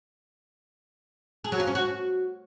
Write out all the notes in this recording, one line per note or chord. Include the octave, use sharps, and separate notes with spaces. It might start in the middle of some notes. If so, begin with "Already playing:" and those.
G#4
F#3
F4
C#4
F#4